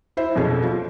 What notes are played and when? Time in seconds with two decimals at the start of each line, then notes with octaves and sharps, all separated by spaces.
0.17 E4 C5 E5
0.35 F2 B2 C#4 G#4 A4
0.63 F3